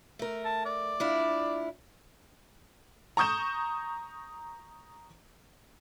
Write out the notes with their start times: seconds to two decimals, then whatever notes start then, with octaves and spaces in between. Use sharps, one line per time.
0.19 A3 A#4
0.45 A5
0.65 D5
1.00 D4 E4 F4
3.17 A#5 C#6 D#6 G6 E7